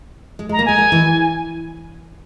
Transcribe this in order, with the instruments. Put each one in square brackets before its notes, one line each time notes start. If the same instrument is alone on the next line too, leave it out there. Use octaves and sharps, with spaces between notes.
[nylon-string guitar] G#3
[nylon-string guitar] G#3 [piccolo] A#5
[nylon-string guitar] A#3
[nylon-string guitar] G#3 [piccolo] G#5
[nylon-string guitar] G#3
E3